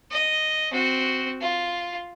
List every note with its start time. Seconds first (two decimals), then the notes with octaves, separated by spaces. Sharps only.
0.11 D#5
0.72 C4 F#4
1.41 F4